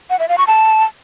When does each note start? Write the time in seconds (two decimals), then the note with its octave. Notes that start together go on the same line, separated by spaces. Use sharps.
0.10 F#5
0.19 E5
0.29 F5
0.38 C#6
0.47 A5